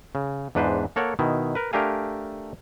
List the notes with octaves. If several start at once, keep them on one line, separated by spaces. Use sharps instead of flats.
C#3
E2 G#2 D4 B4 C5
A#3 A4 A#4 C#5 F#5
B2 D#3 E4
A#4 B4
A3 D4 G4 A#4 F5 G#5